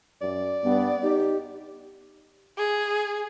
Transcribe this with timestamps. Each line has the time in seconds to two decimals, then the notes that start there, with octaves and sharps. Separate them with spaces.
0.21 F#2 D5
0.63 G2 B3
1.02 D#4 G4
2.58 G#4